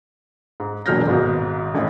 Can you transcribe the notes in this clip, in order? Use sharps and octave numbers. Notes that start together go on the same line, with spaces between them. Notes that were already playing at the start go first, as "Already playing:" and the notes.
G#2
E1 A#2 F#3 F6 G6 A#6
G#1 G#2 B2
A1 A2